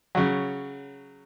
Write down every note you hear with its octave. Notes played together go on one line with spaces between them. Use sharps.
C#3 F#3